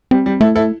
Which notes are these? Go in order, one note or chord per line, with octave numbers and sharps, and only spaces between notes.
G3 C4
G3
A3 E4 A4
E4 A4